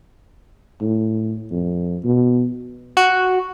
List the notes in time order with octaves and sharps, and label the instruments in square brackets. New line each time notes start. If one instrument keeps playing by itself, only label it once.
[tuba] A2
F2
B2
[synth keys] F#4